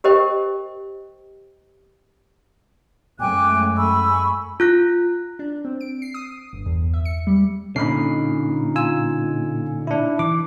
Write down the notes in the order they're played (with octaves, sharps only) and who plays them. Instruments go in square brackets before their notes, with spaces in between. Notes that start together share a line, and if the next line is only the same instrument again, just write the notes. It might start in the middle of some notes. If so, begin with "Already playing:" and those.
[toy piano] G4 A#4 C5 D#5 G5
[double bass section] F#2 G#3 A3 [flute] G5 [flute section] G#5 D6 F#6
[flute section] G#5 B5 C#6 [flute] E6
[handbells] F4 F#6 A#6
[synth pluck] D4
C4
D7
C7
D#6
G1
E2
E5
C#7
G3
[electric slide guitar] A#2 D3 [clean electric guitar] C#4 D#4 [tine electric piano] B5 C7
[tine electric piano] F4 G#5 E6
D4 E4
[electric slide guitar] E3 [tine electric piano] D6